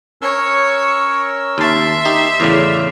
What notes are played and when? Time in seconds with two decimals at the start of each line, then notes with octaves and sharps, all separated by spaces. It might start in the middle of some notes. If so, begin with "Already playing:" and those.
0.22 C#4 A#4 C#5 E6
1.58 D#2 E5 A5 C6
2.05 D#4 G4
2.40 E2 A2 C#3 D5 F6